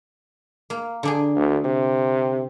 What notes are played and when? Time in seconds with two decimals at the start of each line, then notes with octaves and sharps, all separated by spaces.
0.70 A#3
1.03 D3 D4 G#4
1.36 D2
1.65 C3